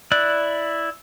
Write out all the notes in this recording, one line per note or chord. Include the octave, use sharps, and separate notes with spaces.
E4 D5 F#6